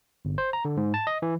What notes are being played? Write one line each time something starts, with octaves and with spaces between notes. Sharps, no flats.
G1
C5
A#5
D3
G#2
A5
D#5
E3